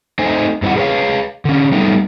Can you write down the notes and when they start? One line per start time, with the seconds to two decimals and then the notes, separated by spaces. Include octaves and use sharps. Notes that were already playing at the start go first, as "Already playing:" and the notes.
0.19 A3 C4 D#4 C5 D#5 G#5
0.62 G2 C4 D#4 E4 F#5
0.76 G#4 B4 C#5 F5
1.45 D3 C#4
1.72 G3 A3 B3 D#4